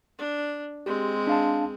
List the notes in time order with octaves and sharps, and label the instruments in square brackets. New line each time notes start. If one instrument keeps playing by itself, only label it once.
[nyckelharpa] D4
[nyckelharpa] G#3 C4 [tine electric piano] G4
[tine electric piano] D4 F5 A5